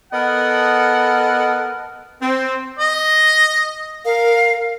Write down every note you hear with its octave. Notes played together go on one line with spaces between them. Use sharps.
B3 A4 A#4 D#5 F#5
C4
D#5
A#4 F5